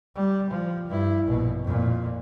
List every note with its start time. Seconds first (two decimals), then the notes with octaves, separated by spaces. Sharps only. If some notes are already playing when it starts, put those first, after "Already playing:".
0.16 G3
0.51 F3
0.88 G2 E4
1.26 A#1 B2
1.63 F2 A#2